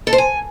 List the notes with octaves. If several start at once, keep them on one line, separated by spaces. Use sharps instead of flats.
A4
C5
G#5